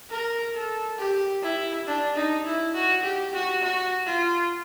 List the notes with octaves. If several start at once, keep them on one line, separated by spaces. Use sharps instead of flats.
A#4
A4
G4
E4
D4
D#4
E4
F#4
G4
F#4
F#4
F4